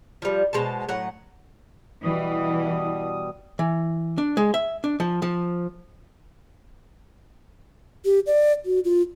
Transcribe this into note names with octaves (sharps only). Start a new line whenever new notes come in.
F3 G3
B2 G#3 C5 A5
A2 F#3 F#5
B2 E3 G3 D#6
E3
D4
G#3
E5
D4
F3
F3
G4
D5
F#4
F4